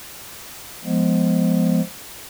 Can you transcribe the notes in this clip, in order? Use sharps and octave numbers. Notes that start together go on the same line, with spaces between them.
F3 G#3 B3